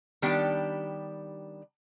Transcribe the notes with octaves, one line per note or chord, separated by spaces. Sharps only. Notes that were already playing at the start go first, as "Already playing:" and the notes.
D#3 G3 B3 D4 G4